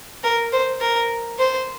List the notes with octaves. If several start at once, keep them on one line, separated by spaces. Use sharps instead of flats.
A#4
C5
A#4
C5